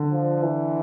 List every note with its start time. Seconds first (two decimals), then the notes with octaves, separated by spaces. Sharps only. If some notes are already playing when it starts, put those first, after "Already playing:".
Already playing: D3
0.11 F3
0.43 E3